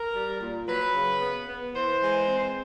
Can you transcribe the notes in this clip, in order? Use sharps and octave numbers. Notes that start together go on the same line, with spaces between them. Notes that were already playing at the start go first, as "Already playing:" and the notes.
Already playing: A#4
G3
A#2
F#3 B4
C#3
B3
B3
E3 C5
G#3
C4